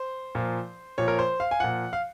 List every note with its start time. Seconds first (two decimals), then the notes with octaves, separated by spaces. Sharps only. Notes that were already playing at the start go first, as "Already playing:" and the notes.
Already playing: C5
0.35 A#2 F3
0.98 A#2 F3 C#5
1.08 A#4
1.19 C5
1.40 F5
1.51 G#5
1.60 A#2 F3 F#5
1.93 F5